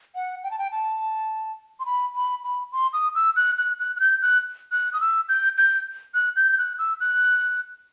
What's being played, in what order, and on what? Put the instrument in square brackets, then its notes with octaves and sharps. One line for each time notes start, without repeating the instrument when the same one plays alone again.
[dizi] F#5
G5
A5
G5
A5
C6
B5
B5
B5
C6
D#6
E6
F#6
F#6
F#6
F#6
G6
F#6
F#6
D#6
E6
G6
G6
F#6
G6
G6
F#6
E6
F#6